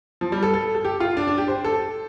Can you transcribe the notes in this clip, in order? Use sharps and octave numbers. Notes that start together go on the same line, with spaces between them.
F3
G3
A4
A4
A4
G4
F4
D4
D4
G4
C5
A4